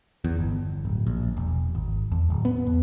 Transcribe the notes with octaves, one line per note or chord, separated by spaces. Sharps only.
E2
G1
D1
A#1
E1
G#1
E2
D1
B3
E2